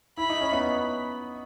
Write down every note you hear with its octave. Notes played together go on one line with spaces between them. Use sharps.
E4 B5
D#4
C#4
B3 D#4